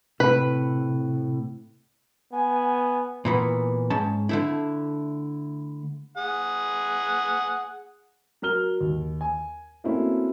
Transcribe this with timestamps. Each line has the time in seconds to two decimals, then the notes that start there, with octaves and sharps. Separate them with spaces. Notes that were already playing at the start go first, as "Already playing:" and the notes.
0.20 A2 C3 B4
2.33 B3 G#5
3.25 A#2 E3 B3
3.90 G#2 C#4 A5
4.29 D3 A3 E4
6.17 G#4 F#5
8.42 F#3 A#4 F6 G7
8.81 D#2
9.21 G#5
9.84 A3 A#3 C4 C#4 E4 F#4